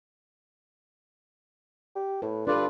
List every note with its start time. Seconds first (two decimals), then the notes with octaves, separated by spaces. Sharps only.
1.96 G4
2.22 A2 B4
2.47 G2 D4 F4 A4 B4 D5